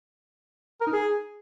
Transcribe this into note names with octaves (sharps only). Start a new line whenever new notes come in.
A#4
D#4
G#4